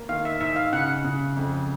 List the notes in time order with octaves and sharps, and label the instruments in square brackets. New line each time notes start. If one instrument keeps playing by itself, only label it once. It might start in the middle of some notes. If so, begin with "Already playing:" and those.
Already playing: [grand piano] A#3
[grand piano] D#3 [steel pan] F5
[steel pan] E5
[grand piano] G#2 [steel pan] E5
[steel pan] F5
[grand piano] C#3 [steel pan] F#5
[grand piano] C#3
F2